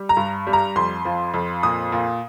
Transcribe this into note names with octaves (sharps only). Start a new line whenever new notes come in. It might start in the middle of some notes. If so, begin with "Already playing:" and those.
Already playing: G3
A#5
G2
G3
A#5
F2 C6
F3
F2
A#2 D#6
A#2